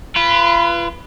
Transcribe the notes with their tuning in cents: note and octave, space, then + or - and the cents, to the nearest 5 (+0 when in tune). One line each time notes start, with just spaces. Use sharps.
F4 -35 B4 +0